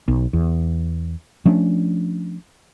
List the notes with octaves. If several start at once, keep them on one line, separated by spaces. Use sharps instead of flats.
B1
E2
F3 A3 C#4 D4